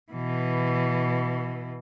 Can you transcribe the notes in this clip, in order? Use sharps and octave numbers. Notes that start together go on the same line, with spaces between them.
B2 E3